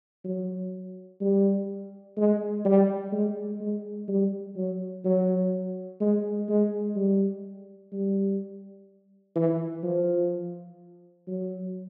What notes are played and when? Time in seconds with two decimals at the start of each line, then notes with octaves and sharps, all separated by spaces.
0.25 F#3
1.21 G3
2.17 G#3
2.65 G3
3.12 G#3
3.61 G#3
4.08 G3
4.57 F#3
5.05 F#3
6.01 G#3
6.49 G#3
6.96 G3
7.92 G3
9.36 E3
9.84 F3
11.28 F#3